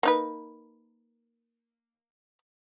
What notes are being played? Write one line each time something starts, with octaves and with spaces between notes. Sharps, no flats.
A#3 D#4 B4